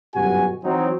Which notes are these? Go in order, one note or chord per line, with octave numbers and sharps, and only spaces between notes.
G1 F#2 B2 F#4 G4 G#5
E3 F#3 C4 D#4